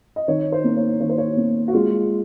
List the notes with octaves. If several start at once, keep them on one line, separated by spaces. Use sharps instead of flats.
D#5
D#3 C#5
C5
A#3
C#5
D#3 C#5
C5
C#5
A#3
F#4
G#3 F4